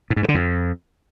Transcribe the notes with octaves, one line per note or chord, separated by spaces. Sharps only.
A2
G#2
G2
D3
F2